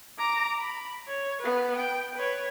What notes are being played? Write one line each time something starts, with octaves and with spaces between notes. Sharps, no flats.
A#5 D6
B5
C#5
B3 B4
G5
B4 C#5